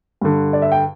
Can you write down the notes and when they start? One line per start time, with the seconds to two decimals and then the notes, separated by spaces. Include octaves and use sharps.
0.21 G2 D3
0.53 D5
0.62 E5
0.72 G5